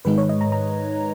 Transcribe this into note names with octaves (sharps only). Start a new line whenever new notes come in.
G#2 D#3 G#3 D#4 B4
C#5
D#5
A#5
A#5